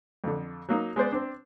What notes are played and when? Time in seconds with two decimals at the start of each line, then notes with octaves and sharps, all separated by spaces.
0.24 F2 D3
0.69 F#3 A#3 D#4
0.96 G#3 B3 C5 D5
1.12 C4 D4